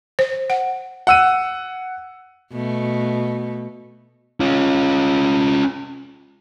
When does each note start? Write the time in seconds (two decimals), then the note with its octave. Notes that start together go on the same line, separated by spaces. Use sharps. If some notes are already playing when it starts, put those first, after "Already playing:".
0.19 C5
0.50 F#5
1.07 F#5 E6 D#7
2.52 B2 A3
4.40 C#4 F4